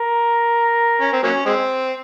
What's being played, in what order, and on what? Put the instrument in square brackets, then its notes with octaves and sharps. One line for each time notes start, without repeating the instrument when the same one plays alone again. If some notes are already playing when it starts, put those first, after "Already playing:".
Already playing: [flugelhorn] A#4
[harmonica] C#4
C4
F#3 A#3 C#4
G#3 C4